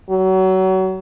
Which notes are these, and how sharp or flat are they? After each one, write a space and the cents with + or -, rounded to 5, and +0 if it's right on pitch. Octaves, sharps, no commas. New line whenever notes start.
F#3 +30